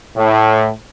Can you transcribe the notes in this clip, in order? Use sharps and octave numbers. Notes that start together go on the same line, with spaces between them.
A2